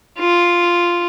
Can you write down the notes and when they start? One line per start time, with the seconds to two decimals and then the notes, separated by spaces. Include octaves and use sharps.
0.18 F4